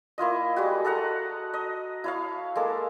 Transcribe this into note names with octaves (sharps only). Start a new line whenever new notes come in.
A#3 E4 F4 D#5
G3 G#3 F#4
A4 D#5 F#5 A#5
D#5
E4 C#5 F5
G#3 A#3 A4